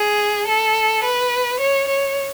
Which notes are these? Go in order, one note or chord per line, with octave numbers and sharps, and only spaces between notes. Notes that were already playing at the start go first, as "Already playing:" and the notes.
Already playing: G#4
A4
B4
C#5
C#5